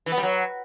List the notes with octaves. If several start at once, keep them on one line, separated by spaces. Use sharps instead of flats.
E3
B3
G3
F#3